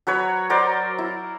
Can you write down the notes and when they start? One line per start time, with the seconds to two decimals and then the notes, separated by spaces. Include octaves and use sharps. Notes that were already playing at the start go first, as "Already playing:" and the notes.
0.07 F#3 B4 C#5 B5
0.50 F#3 A#4 C5 D5
0.98 E4